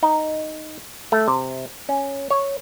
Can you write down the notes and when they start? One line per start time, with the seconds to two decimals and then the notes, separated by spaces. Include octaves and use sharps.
0.03 D#4
1.12 A3
1.28 C3
1.89 C#4
2.30 C#5